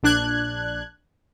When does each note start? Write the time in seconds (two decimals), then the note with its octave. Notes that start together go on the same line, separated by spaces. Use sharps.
0.03 A#1 D4 F#6 G#6